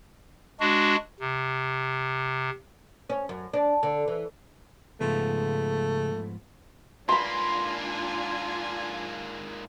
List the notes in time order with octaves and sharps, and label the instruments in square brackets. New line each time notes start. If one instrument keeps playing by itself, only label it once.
[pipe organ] G#3 D4 F#4
C3
[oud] C#4
F#2
D4
D3
E3
[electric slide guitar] G#2 F3 B3 [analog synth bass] C#3 [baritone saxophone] A3
[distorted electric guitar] G#2 A#3 [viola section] D4 F4 G#5 [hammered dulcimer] B5 C6